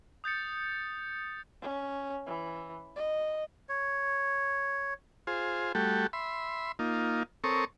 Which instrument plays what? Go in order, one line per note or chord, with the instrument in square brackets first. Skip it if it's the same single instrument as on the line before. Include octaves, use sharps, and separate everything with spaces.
[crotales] D#6 G6 A6 C#7
[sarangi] C#4
E3
D#5
[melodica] C#5
[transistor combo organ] F4 G#4 C5
G3 A3 F#4 G4 A4
E5 B5 C6
A#3 D#4 F4
C4 A4 A#4 C#5 C#6 D#6